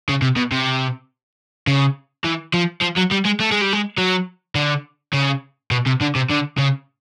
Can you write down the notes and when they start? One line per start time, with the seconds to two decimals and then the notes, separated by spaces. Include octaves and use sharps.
0.09 C#3
0.22 C3
0.37 B2
0.52 C3
1.67 C#3
2.24 E3
2.54 F3
2.82 F3
2.97 F#3
3.12 G3
3.26 G#3
3.40 A3
3.52 G#3
3.62 G3
3.73 G#3
3.98 F#3
4.55 D3
5.13 C#3
5.71 B2
5.86 C3
6.01 D3
6.15 C3
6.29 D3
6.58 C#3